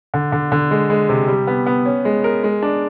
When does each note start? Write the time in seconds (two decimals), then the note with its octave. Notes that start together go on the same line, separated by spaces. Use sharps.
0.14 D3
0.32 D3
0.52 D3
0.71 G#3
0.90 G#3
1.09 C3
1.28 G3
1.47 B3
1.66 B3
1.86 C#4
2.05 G#3
2.24 A#4
2.44 G#3
2.62 D4